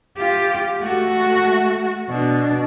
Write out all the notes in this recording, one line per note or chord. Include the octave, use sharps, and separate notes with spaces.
F4 G4
A3 F#4
B2 D4